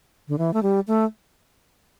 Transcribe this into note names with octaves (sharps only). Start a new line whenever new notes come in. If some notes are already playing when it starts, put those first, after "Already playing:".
D3
E3
A3
G3
A3